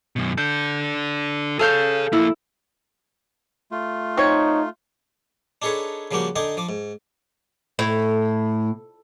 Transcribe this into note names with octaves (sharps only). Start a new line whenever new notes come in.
F#2 B2
D4 A4 G6
G#4 A4 C#5 F5 G6
F3 A#3 E4
A3 F4
C4 D#4 C#5
D4 D#4 G#4 A4 B4 C#5
C#3 F3 G3 A#3 F#4 G5
D3 D#4 D#5 G5 G#5 D6
F3 D6
G#2
A2